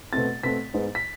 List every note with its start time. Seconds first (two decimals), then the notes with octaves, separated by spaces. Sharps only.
0.13 B2 A3 C4 A6
0.43 B2 A3 C4 B6
0.74 G#2 G#3 B3
0.95 B6